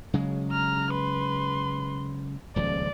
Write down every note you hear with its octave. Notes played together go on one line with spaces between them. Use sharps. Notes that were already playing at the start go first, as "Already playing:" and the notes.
C#3 F#3 G#3
A#5 F6
B4 C6
D#1 C#2 F3 D5